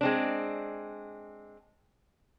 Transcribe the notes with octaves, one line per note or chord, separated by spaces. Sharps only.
G#3 C4 D4